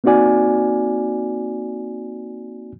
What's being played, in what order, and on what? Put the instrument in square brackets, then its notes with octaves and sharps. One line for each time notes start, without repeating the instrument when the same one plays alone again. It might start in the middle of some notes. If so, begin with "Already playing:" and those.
[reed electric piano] A#3 C4 D#4 F#4 D5 G#5